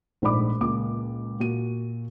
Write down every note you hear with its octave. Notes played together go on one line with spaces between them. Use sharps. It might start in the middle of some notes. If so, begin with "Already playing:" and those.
A#1 G#2 A3 D5 B5 D6
C#2 A#2 D6
A#2 F#4 D#7